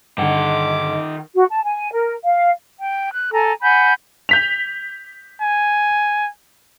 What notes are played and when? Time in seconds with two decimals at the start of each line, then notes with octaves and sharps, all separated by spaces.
0.18 G2 D3 D#3 D#5 F#5 D6
1.34 F#4
1.50 A5
1.63 G#5
1.92 A#4
2.25 F5
2.80 G5
3.14 F#6
3.32 A4 G#5 A#5
3.62 F#5 G#5 B5 G6
4.29 G6 B6 F7
5.41 G#5